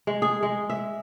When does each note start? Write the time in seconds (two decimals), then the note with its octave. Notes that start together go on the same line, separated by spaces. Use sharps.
0.07 G#3
0.22 G#4
0.43 G#3
0.70 E5